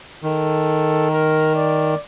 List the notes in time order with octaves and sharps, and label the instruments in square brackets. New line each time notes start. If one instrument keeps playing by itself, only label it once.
[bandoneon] D#3 [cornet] A4
[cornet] A#4
D5